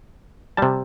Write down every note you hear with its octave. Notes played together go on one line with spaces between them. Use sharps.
C3 G3 A5